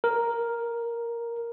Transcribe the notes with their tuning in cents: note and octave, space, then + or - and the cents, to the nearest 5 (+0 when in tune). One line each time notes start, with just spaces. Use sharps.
A#4 +5